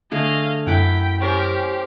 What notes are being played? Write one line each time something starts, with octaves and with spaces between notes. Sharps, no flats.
D3 A3 G#4 D#5 F5
F#2 E4 F#5 G5 D6 B6
C4 C#4 G4 A#4